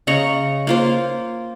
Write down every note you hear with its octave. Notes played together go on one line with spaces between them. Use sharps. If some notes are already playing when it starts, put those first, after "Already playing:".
C#3 D#5 A#5 C#6
A#3 F4 C5